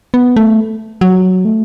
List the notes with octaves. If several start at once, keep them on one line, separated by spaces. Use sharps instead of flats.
B3
A3
F#3
A3